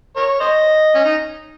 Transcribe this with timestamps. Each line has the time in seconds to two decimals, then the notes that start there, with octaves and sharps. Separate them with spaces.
0.16 A#4 C#5
0.40 C5 D#5
0.95 C#4
1.05 D#4